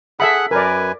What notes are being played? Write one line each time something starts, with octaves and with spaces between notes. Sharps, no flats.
G#4 A4 E5 F#5 B5 F#6
F#2 A#4 B4 D5 G#5